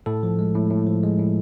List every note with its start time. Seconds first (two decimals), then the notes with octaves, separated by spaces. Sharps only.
0.06 A2 A4
0.23 F3
0.39 G#3
0.55 A2
0.71 A2
0.87 F3
1.03 G#3
1.19 A2